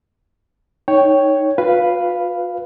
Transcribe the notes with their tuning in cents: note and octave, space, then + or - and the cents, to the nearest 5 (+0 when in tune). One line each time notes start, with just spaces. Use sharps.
D#4 +0 C#5 +0 G5 +0
F4 +45 B4 +0 F5 -5